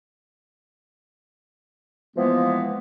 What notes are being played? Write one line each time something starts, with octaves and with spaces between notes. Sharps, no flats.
E3 F3 G#3 A#3 B3